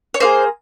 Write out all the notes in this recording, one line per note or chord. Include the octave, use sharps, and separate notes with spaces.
C#5
A#3 F4 G#4 C5